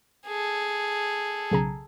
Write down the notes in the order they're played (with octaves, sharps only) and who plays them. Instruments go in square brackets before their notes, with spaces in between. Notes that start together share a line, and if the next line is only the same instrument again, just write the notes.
[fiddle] G#4 A4
[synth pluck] B1 C#3 A#5